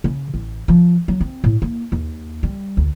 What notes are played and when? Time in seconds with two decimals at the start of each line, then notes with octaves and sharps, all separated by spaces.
0.04 C#3
0.34 A1
0.68 F3
1.08 F#3
1.20 C4
1.44 A2
1.62 A#3
1.92 D#2
2.43 G3
2.77 D2